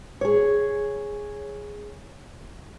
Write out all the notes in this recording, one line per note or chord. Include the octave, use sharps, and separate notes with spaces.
G#4 C#5